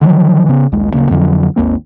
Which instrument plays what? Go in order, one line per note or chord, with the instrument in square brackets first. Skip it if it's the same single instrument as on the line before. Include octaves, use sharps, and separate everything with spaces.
[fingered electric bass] D3 D#3 F3 F#3
C#3 B3
A#1 D#2 G#3
D1 F2 C#3 A#3
F2 D3 F#3
G#1 D#2 A#3 C4